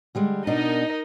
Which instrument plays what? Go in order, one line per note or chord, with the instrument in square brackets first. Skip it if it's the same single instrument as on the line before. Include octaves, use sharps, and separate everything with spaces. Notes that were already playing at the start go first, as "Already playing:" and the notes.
[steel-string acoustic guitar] D3 G3 G#3
[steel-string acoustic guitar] B2 D4 [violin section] D#4 A#4 D#5